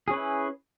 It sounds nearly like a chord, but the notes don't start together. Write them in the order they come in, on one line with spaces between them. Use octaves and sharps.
G#4 C#4 B4 E4